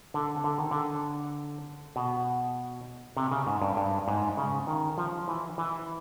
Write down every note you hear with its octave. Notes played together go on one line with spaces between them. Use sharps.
D3
D3
D#3
D3
B2
C3
C#3
G#2
G2
G2
G#2
C#3
D#3
F3
E3
E3